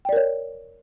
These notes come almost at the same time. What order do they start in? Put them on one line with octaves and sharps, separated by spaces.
G5 D5 A#4 C#5